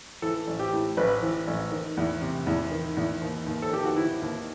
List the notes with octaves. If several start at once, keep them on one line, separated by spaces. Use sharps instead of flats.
E3 A4
A1
G4
A2
A1 B4
E3
A1
D#3
E2
C3
E2
D#3
E2
D#2
D#2
A4
D#3 G4
F#4
D#3 E4
D#2